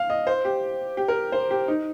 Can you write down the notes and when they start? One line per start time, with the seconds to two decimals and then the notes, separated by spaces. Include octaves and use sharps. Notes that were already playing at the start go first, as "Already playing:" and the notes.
Already playing: F5
0.10 D#5
0.27 C5
0.45 G4
0.97 G4
1.08 A#4
1.32 C5
1.51 G4
1.68 D#4